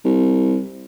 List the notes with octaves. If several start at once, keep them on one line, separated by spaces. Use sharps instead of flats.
C2